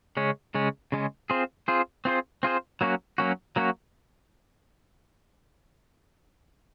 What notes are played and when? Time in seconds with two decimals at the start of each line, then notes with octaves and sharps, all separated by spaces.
0.17 C#3 G#3 C#4
0.55 C#3 G#3 C#4
0.92 C#3 G#3 C#4
1.30 C4 F4 G#4 C5
1.68 C4 F4 G#4 C5
2.05 C4 F4 G#4 C5
2.43 C4 F4 G#4 C5
2.81 F#3 A#3 C#4 F#4
3.18 F#3 A#3 C#4 F#4
3.56 F#3 A#3 C#4 F#4